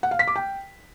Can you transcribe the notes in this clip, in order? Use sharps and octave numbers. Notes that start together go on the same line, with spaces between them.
F#5
F5
B6
D6
G5